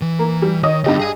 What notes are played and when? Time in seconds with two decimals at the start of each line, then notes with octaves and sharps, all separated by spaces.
0.02 E3
0.19 A#3
0.42 G3
0.63 D#3 C#5 D#5 D#6
0.84 G2 D3 B3 G4 D#5
0.99 G#4 G#5